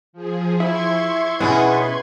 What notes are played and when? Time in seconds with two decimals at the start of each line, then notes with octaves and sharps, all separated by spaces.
0.13 F3 G#4
0.60 E4 C6 C#6 G#6
1.40 B2 B3 C#4 D#4 E4 G#4 B4